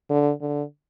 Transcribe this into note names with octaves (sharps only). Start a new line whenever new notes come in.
D3
D3